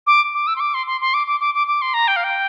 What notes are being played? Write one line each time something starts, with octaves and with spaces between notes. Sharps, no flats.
D6
D6
E6
C6
D6
C6
C6
C6
D6
D6
D6
D6
D6
C6
A#5
G5
F5
G5